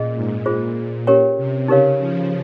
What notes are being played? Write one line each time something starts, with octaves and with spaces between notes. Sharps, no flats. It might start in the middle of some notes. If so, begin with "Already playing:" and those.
Already playing: A#2 C#4 G#4 D#5
G#2
A#2 F4 G#4 C5
C#4 G4 A#4 C#5 G5
C3
C#3 D#4 G4 A#4 C#5 F5
F3